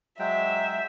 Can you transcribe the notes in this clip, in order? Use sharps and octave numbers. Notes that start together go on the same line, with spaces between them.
F#3 G#3 E5 G5